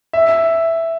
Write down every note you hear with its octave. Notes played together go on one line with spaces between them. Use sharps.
E5